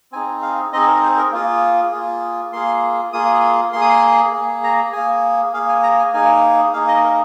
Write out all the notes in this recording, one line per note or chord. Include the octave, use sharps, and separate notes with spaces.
C4 D#4 G#4 G#5
F5
C4 D#4 G#4 D#5
A#4
C5
A#4
A#3 F4 G#4
A#3 F4 G#4
A#3 F4 G#4 C6
A#3 F4 G#4 D#6
A#3 G#4 C6
D#6
C6
A#3 G#4
A#5
A#3 G#4 G#5
A#3 G#4 F5
G#5
A#5
G#5
A#3 D#4 G#4 G#5
A#3 D#4 G#4 F5
D#5
A#4